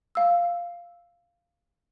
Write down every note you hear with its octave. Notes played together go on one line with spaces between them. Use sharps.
F5 E6